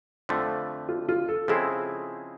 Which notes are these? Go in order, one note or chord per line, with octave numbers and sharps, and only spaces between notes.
F2 D3 F3 A3
F4
F4
A4
C#3 F3 G#3 C4 E4 G#4